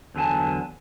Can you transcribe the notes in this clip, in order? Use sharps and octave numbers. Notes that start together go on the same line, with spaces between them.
E2 D3 F#3 G#5 A5